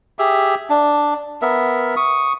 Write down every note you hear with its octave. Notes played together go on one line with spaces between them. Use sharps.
G4 G#4 E5
D4
B3 A#4 E5
C#6 D#6